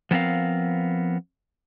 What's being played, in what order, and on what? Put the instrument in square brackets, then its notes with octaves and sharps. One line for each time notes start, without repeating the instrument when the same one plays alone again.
[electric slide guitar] F3 B3 C4 A#4 F5